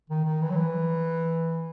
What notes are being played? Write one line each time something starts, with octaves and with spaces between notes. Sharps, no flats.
D#3
D#3
E3
F#3
E3